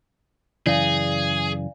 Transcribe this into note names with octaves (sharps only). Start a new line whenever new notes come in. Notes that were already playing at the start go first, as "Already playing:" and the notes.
F#2 C#3 E3 G#4 D5 F5 G#5